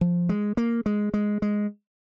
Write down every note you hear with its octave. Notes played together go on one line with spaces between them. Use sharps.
F3
G#3
A#3
G#3
G#3
G#3